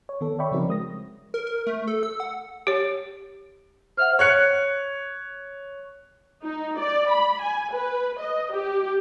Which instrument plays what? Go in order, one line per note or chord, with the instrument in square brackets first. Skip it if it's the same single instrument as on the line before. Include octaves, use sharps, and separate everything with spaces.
[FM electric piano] C#5
D#3 B3 A4
C#5 D5 E5 G5 B5 C#6
C#3 F3 C4 D#4 F#4 A#4
G#3 D#6 A#6
[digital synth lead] A#4
A#4
A3
A4
E6
F#5
[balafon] G4 C#5
[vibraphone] C5 E5 F#5 [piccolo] F6
[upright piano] C#5 F#6 C#7
[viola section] D#4
D5
B5
G#5
B4
D#5
G4